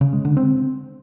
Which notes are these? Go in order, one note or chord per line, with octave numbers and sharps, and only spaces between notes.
C#3
G#3
D3
C4